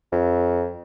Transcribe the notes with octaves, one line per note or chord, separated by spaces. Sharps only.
F2